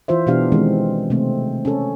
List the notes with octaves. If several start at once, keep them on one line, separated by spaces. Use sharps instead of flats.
E3 F4 C5 E5
B2 E3 B3 D4 G4 F5
D#3 E3 G#3 C4
C3 A3 C4
C#4 A4